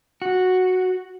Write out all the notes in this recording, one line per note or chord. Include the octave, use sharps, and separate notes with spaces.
F#4